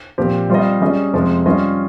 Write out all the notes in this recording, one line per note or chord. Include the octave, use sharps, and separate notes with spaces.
A#2 F3 C4 G4
G3 C4 F4 C5 D#5
G3 C#4 G#4 D#5
F2 C3 F3 G#3
G3 C#4 F4 C5 D#5